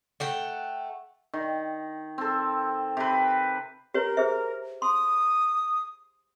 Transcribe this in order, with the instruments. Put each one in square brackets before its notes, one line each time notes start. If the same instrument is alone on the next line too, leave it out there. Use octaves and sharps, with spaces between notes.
[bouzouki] A3 F#5 G5
[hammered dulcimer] D#3
C4 A4
C3 B4
[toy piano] G4 B4 C#5 [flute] A#4
[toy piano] G#4 C5 E5
[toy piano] C6 [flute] D#6